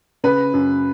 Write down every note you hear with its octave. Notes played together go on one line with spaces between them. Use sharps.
C#3 B4
F#2